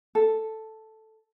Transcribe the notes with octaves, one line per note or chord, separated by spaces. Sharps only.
A4